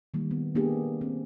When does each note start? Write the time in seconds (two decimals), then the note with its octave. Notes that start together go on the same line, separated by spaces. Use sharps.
0.14 D#3 G3 A#3
0.31 B3
0.55 A#3 B3 D4 G4 G#4
1.01 C4